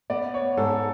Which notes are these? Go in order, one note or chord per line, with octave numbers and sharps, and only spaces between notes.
B3 D5
C#5
G#2 A4